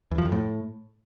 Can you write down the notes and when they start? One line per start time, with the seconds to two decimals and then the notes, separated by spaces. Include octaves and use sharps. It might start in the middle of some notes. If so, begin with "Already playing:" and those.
0.11 E2
0.18 F3
0.25 F2
0.32 A2